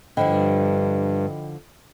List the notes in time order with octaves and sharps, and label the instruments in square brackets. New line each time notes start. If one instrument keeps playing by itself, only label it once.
[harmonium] G2 [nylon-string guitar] D3 F3 E4 [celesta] D#5 G5 B5